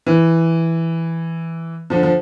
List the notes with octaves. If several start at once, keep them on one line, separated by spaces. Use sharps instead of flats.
E3
D3 F3
F3